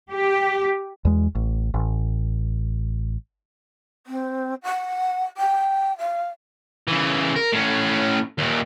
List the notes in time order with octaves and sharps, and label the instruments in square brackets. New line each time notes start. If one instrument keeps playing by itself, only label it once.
[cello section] G4
[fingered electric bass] E2 G#3
A1
A1
[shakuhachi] C4
F#5
G5
F5
[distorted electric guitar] C#3 E3
A#4
A2 C#4
D#2 A#2